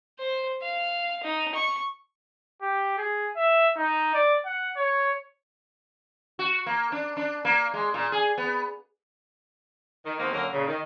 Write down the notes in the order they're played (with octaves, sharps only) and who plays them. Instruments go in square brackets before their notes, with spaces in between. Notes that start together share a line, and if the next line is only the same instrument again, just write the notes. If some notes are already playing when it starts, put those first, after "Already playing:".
[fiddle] C5
F5
D#4
C#6
[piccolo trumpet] G4
G#4
E5
D#4
D5
F#5
C#5
[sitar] F#4
A#3
D4
D4
A#3
G#3
A#2
G#4
B3
[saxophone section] D#3
E2 D#3 A#3 C4
D3 F#3 A#3 C#4 A#4
A#2 C#3
D#3